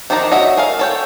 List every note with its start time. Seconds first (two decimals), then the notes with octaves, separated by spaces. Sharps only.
0.10 D#3 F3 D4 D#4 A#5
0.32 F#4 C#5 D#5 E5
0.57 G#4 A#4 F5
0.79 A4 C#5 G5